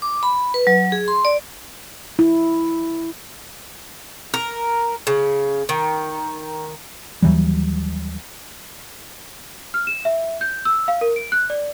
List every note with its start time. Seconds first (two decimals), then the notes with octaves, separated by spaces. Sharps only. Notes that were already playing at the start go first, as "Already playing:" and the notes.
0.02 D6
0.23 B5
0.54 B4
0.67 F#3
0.92 G#4
1.08 C6
1.25 D5
2.19 E4
4.34 A#4
5.07 C#3
5.69 D#3
7.22 D#2 E3 F#3 G3
9.74 F6
9.87 E7
10.05 E5
10.41 G6
10.65 E6
10.88 F5
11.01 A#4
11.16 D7
11.32 F#6
11.50 D5